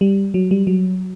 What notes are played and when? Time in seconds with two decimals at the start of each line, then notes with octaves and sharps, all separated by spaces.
0.01 G3
0.34 F#3
0.51 G3
0.67 F#3